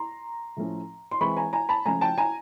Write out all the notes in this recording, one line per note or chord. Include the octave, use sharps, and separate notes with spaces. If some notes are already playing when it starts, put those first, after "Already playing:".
Already playing: A#5 C6
A2 F3 A3 C#4
C6
E3 G#3 C4 E4 B5 C#6
G#5 A#5
G#5 A#5
A5 B5
C#3 F3 A3 C#4 G#5 A#5
G5 A5
G#5 A#5